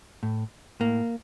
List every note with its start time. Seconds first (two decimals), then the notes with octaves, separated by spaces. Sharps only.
0.23 A2
0.80 A2 A#3